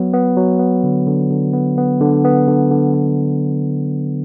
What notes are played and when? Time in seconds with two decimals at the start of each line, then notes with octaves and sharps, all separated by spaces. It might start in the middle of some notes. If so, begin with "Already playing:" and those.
Already playing: F#3 B3
0.14 B3
0.37 F#3
0.59 B3
0.84 D3
1.07 D3
1.30 D3
1.54 B3
1.78 B3
2.01 D3
2.24 B3
2.48 D3
2.71 D3
2.94 B3